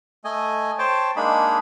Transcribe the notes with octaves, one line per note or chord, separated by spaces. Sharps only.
A3 D#5 G#5
C5 C#5 G5 A5
G#3 A#3 D4 D#4 G#4 B5